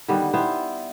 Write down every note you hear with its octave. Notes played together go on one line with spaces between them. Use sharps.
D3 D#3 G3 B3
B3 E4 C5